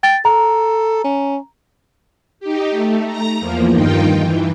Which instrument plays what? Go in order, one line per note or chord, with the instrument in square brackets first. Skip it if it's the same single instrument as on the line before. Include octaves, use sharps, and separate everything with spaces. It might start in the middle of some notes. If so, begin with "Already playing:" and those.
[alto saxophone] G5 [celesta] A6
[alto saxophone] A4 [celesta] A#5
[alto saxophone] C#4
[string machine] D#4 G4
A3
A#5 A#6
E2 F3 A#3
G2 D#3 D#4 F4 G5
E3